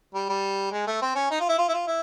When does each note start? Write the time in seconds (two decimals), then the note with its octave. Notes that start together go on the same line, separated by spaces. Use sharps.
0.14 G3
0.29 G3
0.72 G#3
0.87 A3
1.02 C4
1.15 C#4
1.30 D#4
1.40 F4
1.49 E4
1.58 F4
1.68 E4
1.74 F4
1.87 E4